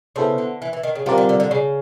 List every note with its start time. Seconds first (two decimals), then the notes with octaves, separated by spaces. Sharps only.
0.16 C#3 B3 E4 A4 C5
0.38 D3
0.62 E3
0.73 E3
0.83 D#3
0.95 C#3
1.06 D3 G3 C4 F4 A#4 D5
1.18 D3
1.29 D3
1.40 D3
1.51 C#3